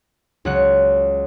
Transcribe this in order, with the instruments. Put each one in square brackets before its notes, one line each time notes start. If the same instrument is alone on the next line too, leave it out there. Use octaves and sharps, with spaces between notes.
[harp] C#2 F#3 F#5 F#6